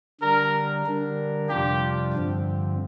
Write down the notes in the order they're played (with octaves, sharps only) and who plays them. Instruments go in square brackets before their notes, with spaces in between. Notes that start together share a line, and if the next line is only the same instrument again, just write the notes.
[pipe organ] D3 G3 D4 [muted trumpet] A#4
[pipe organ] D3 G3 D4 A#4
[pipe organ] F2 C3 G3 D4 F4 [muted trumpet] G4
[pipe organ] G2 D3 F3 C4